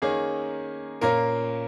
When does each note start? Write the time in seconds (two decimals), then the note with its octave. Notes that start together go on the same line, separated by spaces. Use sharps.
0.02 D#3 A#3 C#4 G#4
1.01 A#2 A#3 C#4 A#4